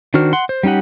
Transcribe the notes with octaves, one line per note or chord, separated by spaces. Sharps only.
D#3 D4 F#4 C5 F6
F#5 C6
C5
G3 C#4 D#4 G4 F#5